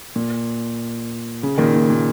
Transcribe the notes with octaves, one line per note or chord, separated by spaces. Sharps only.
A#2
C#3
A#2 D#3
A#2
A#2